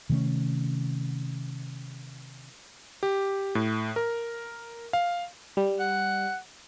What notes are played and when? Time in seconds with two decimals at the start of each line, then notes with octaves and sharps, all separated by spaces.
0.10 C3 D#3 A3 C#4
3.03 G4
3.55 A2
3.96 A#4
4.93 F5
5.57 G3
5.80 F#5